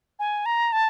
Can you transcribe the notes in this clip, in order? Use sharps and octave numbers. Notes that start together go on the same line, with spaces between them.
G#5
A#5
A5